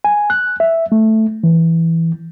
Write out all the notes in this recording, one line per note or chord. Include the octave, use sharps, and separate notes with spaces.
G#5
F#6
E5
A3
E3